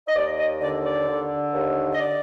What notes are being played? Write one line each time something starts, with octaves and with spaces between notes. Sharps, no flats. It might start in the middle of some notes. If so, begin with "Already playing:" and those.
D#5
D#2 D5
D#5
D3 D5
D5
D3
D#2
D#5
D5